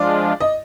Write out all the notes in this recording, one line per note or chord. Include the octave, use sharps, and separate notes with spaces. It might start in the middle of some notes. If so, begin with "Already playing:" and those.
Already playing: F3 G#3 D4 F4 D5
D#5